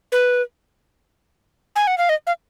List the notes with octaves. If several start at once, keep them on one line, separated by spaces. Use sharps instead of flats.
B4
G#5
F#5
F5
D#5
F5